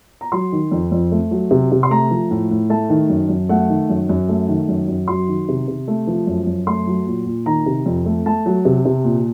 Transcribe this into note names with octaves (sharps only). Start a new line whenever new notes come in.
A#5
F#3 C6
D#3
F2
F2
A3
F#3
C3
C3
C6
A3 A#5
F3
A2
A2
A3 A5
D#3
F#2
F#2
A3 F#5
D#3
F#2
F#2
A3
D#3
F#2
F#2
F#3 C6
D#3
C3
C3
A3
F3
F#2
F#2
A3 C6
F#3
A#2
A#2
D#3 A#5
C3
F2
A3
A3 A5
F#3
C3
C3
A#2